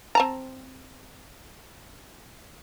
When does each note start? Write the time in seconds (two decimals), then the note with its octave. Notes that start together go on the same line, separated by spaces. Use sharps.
0.15 C4 A5 A#5